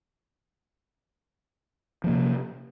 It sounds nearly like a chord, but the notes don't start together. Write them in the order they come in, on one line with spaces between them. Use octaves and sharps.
F3 A#3 C3